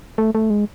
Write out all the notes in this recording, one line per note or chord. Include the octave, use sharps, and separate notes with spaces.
A3
A3
G#3